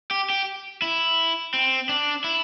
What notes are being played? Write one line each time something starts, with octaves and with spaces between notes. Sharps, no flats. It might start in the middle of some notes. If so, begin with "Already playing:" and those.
G4
G4
E4
C4
D4
E4